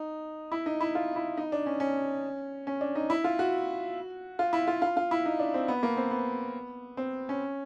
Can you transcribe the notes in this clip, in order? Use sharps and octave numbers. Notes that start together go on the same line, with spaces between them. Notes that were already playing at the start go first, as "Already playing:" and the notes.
Already playing: D#4
E4
D#4
E4
F4
E4
D#4
D4
C#4
C#4
C#4
D4
D#4
E4
F4
F#4
F4
E4
F4
F4
F4
E4
D#4
D4
C4
B3
A#3
C4
B3
C4
C#4